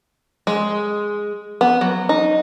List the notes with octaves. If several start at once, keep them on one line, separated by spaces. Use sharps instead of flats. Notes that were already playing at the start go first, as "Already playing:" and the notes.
G#3
B3
F#3
D#4